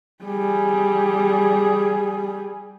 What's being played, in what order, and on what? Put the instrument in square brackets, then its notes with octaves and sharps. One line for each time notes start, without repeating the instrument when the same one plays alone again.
[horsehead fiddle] G3 G#4